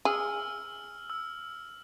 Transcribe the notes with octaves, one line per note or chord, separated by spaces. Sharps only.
G#4 E6 F6
E6